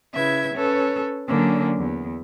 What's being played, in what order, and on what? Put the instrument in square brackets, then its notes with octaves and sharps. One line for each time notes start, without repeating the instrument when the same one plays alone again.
[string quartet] C#3 E4 B4 E5 G#6
C#4 A4 B4 C#5
D3 F#3 A#3 C#4 D4
E2